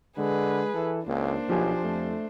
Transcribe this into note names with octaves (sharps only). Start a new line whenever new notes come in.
D3 G#3 G#4 B4
E3 A4
C#2 A#3 D4 C5
B1 F3 G4 G#5
F2 A3